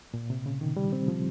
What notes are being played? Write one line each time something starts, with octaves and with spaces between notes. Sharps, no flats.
A#2
C3
C#3
D#3
G3
C4
F3